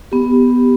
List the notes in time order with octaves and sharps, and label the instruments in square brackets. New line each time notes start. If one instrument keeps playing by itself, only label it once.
[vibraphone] B3 G4